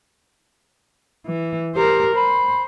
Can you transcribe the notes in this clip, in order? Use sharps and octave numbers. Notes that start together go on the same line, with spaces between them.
E3
G4 A#4 C5
C5 B5